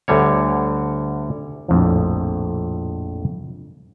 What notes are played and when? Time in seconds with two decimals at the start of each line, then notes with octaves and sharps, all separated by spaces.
0.08 D2 D3 G3 C#5
1.68 A#1 F2 A2 F3